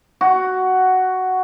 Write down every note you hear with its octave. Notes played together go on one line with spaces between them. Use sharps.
F#4